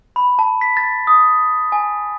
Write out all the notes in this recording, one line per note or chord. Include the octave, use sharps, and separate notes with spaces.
B5
A5
B6
A6
D#6
G#5